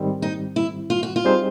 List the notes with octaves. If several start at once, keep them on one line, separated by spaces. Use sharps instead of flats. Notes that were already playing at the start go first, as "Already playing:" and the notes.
Already playing: G#2 D#3 G3 C4
D#4
E4
F4
F#4
F4
G3 C4 D#4 G#4 C5